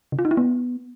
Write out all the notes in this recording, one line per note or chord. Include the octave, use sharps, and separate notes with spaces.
C#3
F4
D#4
E4
B3